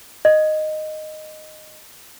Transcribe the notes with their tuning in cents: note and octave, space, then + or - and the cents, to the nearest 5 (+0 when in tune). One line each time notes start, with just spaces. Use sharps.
D#5 -10